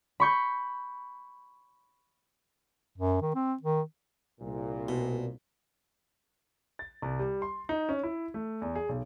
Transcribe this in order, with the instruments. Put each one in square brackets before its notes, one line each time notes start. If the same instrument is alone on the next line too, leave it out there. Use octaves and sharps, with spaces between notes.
[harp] B5 C#6 G6
[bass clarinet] F#2
D#3
C4
D#3
[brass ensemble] C2 A#2
[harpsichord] B2
[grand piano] A6
C2
G3
C6
D#4
C#4
E4
A3
E2
G#4
B1